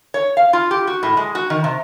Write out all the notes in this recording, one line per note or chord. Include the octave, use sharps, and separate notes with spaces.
C#5
F5
F4
G4
F#4
A2
G#3
F#4
D#3
C3